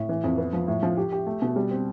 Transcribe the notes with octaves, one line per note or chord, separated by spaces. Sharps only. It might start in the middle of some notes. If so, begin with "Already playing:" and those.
Already playing: A2
E3
F2
B3
F3
A2
F3
G4
G4
A3
B2
G3
C4